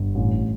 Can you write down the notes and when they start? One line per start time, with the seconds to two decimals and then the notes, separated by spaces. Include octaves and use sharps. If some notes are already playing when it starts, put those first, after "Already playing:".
Already playing: G1
0.15 A1